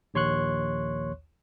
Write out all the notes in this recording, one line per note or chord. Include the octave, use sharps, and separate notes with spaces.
A#1 D#2 C#5 C6 C#6 F#6